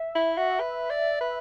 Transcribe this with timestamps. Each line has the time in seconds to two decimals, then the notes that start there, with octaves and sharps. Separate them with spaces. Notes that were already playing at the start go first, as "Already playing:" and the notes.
Already playing: E5
0.15 E4
0.37 F#4
0.60 B4
0.90 D5
1.20 B4